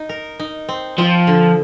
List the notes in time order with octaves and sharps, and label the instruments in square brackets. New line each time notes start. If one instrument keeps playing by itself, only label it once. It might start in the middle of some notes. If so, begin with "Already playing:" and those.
Already playing: [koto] D#4
A#4
D#4
C4
[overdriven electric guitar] F3 [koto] C4
[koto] D3